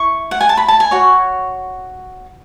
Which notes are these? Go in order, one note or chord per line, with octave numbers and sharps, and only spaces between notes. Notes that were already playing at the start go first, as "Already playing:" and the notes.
Already playing: E4 C#6
F#5
G#5
A5
B5
A5
G#5
F#4 C#5